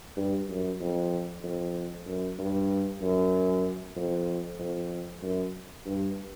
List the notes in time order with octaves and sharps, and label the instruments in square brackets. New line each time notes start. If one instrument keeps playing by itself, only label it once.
[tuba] G2
F#2
F2
F2
F#2
G2
F#2
F2
F2
F#2
G2